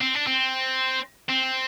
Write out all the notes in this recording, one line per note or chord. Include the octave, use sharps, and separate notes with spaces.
C4
D4
C4
C4